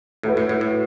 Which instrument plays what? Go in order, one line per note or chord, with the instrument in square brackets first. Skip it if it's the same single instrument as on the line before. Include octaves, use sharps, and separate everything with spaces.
[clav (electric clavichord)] A2 [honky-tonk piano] A3 F#4 B4
[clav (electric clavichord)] A2
A2
A2